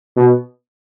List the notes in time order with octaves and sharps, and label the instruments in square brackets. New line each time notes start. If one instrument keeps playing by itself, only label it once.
[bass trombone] B2